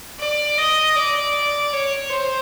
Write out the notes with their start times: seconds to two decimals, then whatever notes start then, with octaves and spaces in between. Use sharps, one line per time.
0.20 D5
0.58 D#5
0.96 D5
1.73 C#5
2.11 C5